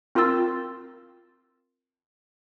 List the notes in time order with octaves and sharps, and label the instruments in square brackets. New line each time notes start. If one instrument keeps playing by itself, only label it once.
[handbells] C4 F4 A#4 C6 E6 A6